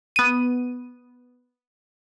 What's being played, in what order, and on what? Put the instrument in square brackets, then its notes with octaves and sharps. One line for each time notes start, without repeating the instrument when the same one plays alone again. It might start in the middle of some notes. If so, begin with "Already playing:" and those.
[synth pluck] B3 D#7